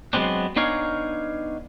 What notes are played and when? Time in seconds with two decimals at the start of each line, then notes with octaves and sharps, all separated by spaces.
0.13 F#3 G#3 B3 C4 D4
0.56 B3 D4 D#4 C#5 F5 G#5